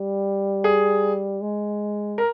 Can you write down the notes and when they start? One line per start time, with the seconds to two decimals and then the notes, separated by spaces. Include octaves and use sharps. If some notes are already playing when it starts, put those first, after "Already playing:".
Already playing: G3
0.64 G#4
1.41 G#3
2.18 A#4